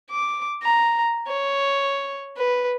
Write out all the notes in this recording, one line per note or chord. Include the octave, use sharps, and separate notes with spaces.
D6
A#5
C#5
B4